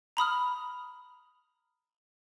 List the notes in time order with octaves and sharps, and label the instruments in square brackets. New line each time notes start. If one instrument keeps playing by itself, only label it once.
[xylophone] A#5 B5 D#6 F6